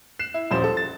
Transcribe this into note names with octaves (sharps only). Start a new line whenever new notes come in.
F#6 C7 E7
E4
D#1 F#2 F3 G3 C5 E7
A4
A6